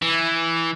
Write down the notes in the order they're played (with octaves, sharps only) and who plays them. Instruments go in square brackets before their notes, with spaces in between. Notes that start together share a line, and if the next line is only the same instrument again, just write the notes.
[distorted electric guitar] E3